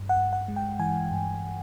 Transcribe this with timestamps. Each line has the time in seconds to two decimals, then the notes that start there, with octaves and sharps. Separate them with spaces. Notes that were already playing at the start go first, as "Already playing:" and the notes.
Already playing: G2
0.09 F#5
0.17 G2
0.33 F#5
0.48 G#3
0.56 G5
0.79 E3 G#5
1.11 G2